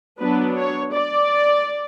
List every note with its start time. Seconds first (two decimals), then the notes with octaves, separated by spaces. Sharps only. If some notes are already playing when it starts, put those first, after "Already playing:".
0.20 F#3 B3 D4 B4
0.57 C#5
0.93 D5